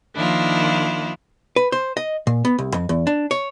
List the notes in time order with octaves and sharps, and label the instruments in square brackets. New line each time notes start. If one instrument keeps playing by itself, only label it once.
[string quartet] D#3 F3 A#3 D4 E4 F4
[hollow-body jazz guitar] B4
C5
D#5
A#2
B3
C2
F2
E2
D4
C#5